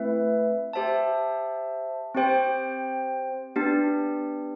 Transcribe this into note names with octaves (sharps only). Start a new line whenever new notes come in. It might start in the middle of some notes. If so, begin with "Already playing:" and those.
Already playing: A3 C4 E4 B4 E5
G4 C5 E5 A5
C4 G4 C5 G5
B3 D4 G4